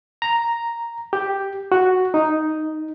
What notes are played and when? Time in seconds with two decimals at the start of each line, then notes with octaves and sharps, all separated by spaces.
0.22 A#5
1.13 G4
1.72 F#4
2.14 D#4